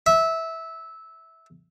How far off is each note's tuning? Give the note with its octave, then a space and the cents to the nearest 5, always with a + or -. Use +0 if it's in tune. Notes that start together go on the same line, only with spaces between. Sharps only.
E5 -15